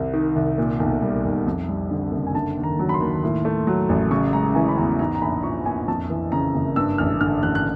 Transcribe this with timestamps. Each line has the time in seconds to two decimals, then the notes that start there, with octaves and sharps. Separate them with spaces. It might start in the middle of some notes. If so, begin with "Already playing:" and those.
Already playing: C2 C3
0.13 D#3
0.36 C2
0.58 A#2
0.80 B1
1.02 G3
1.25 B1
1.47 F2
1.69 G3
1.91 D3
2.12 F#1
2.27 G#5
2.35 D3 A5
2.57 D#2
2.64 A#5
2.79 F#3
2.89 B5
2.94 C6
3.01 D#2
3.24 A2
3.45 A3
3.67 F#3
3.89 A1
4.11 C#3 C#6
4.33 G#3 A#5
4.55 E3 G#5
4.69 B5
4.78 E2 A#5
4.99 G#2 A#5
5.15 A#5
5.22 A#1 B5
5.43 F3 C#6
5.65 A#1 G#5
5.88 F2 A5
6.10 E3
6.32 C#3 A#5
6.55 F#1
6.76 G2 E6
6.98 A1 F6
7.21 D3 F6
7.42 A1 F#6
7.55 F#6